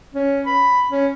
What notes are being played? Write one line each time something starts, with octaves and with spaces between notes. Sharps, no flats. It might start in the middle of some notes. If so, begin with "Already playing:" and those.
C#4
B5
C#4